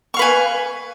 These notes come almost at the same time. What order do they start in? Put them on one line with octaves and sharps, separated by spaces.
C#6 F5 B4 G#5